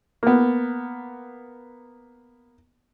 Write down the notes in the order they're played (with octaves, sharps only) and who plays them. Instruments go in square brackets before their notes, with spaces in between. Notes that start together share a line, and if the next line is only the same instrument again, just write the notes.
[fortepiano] A#3 B3